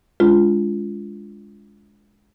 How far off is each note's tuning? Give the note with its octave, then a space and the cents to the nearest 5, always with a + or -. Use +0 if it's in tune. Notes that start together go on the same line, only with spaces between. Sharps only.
G#3 +0 D4 -40 F4 -5